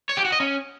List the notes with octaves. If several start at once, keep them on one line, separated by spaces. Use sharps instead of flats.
C#5
G4
F#4
D#5
C#4